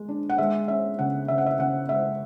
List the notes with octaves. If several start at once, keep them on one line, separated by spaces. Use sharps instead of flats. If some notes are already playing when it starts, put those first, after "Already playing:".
Already playing: G#3
D4
F#5
G#3 E5
C#4 E5
C#3 F#5
C#3 E5
F#5
E5
C#3 F#5
G#3 E5